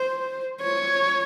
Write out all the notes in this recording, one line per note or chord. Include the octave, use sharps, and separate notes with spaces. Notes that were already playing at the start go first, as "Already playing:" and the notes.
Already playing: C5
C#5